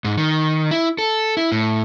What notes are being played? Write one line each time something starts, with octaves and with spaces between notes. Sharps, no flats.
G#2
D#3
E4
A4
E4
A2